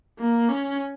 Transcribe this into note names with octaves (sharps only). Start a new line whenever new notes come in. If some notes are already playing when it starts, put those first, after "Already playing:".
A#3
C#4